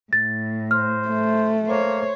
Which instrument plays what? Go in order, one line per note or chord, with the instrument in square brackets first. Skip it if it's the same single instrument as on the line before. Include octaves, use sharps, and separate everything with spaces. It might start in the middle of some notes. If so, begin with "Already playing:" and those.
[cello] A2 [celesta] A6
[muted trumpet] C5 [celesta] F6
[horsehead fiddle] A3
[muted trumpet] A#3 [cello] C5 C#5